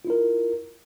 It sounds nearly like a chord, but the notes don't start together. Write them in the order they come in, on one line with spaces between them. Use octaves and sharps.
F4 E4 A#4